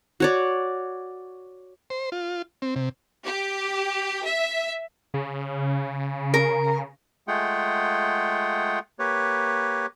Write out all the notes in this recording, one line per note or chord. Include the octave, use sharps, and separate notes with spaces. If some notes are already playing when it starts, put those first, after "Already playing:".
F#4 C#5 D5
C5
F4
C4
C3
G4
E5
C#3
A#4
G#3 A3 F4 G#4 F#5 G5
A#3 G4 B4 C#5